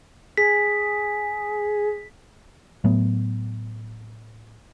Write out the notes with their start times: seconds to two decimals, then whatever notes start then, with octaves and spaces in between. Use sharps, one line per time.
0.37 G#4 B6
2.84 A2 F#3 A3 B3